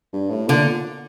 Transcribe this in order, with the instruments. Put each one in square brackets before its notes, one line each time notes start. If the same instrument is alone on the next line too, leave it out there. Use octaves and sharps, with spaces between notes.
[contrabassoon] G2
A2
[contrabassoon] A#2 [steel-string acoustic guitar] D3